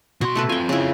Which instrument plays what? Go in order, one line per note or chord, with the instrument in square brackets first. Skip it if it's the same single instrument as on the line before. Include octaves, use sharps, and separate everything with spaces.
[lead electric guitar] B2 C6 [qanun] F#4
[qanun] A3 A4 B4
[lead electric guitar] C4 F4 [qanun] G5 G#5
[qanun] C#3 E4